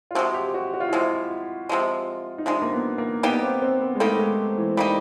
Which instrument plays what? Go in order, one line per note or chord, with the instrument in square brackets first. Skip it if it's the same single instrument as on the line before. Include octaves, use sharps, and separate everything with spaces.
[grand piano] F4
[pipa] C3 F3 G#3 [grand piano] F#4
[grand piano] G4
F#4
F#4
F4
E4
[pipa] C3 F3 G#3 [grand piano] F4
[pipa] C3 F3 G#3
[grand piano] D#4
[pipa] C3 F3 G#3 [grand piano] D4
[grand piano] A#3
B3
A#3
[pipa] G3 A#3 D#4 G4 [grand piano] B3
[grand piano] C4
C4
B3
G#3
[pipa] G3 A#3 D#4 G4 [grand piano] A3
[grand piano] G#3
E3
[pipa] G3 A#3 D#4 G4